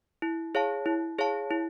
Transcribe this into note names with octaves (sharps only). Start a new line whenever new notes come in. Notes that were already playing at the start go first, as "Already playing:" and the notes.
E4
G#4 C#5 F5 A5
E4
G#4 C#5 F5 A5
E4